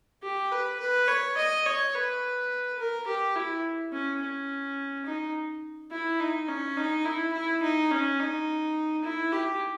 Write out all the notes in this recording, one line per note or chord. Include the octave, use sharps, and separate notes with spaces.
G4
B4
B4
C#5
D#5
C#5
B4
A#4
G4
E4
C#4
C#4
D#4
E4
D#4
C#4
D#4
E4
E4
D#4
C#4
D#4
E4
G4